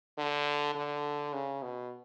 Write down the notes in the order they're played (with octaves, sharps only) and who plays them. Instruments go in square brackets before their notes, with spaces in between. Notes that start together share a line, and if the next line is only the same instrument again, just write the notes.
[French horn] D3
D3
C#3
B2